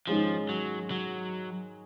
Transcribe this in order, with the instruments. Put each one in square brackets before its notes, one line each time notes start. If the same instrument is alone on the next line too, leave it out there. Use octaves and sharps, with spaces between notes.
[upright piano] G#2 D#3 G#3 C#4 [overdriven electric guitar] F3
[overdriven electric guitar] F#3
F#3